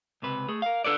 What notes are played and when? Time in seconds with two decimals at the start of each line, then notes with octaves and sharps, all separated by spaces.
0.22 C#2 C3 B4
0.49 A3 G#4
0.62 A#4 F5
0.84 D4 A4 B4 D5